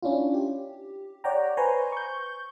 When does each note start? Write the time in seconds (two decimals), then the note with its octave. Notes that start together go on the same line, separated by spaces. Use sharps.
0.03 C#4 D4 E4 F4
0.34 G4
1.24 C#5 D5 F#5 G5 A#5
1.57 B4 C5 G#5 A#5 C6 C#6
1.92 C#6 G6